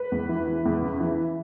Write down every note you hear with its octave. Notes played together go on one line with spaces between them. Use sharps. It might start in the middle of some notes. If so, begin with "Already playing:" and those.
Already playing: B4
E2
E3
E3
E2
C#3
E3